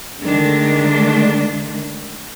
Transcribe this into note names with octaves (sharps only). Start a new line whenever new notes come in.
D3 D#3 G#3 A3 D4